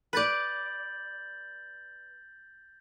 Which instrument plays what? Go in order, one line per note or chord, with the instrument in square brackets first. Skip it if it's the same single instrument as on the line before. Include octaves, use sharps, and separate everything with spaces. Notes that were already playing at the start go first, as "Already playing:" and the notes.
[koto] B4 D5 [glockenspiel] G6 A6 F#7